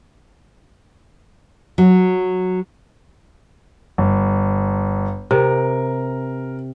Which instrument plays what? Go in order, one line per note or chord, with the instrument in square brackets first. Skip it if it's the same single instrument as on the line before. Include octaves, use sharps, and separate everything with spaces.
[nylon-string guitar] F#3
[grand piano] G1
[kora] C3 [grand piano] A#4